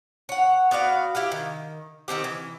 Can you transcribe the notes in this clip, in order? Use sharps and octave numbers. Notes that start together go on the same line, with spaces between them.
C#5 F#5
B3 F#4 D5 F5
E4 G4 F5
D#3
D#3 A#3 C4 G4
E3